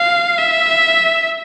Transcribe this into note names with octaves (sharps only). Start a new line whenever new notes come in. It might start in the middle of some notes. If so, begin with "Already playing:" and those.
Already playing: F5
E5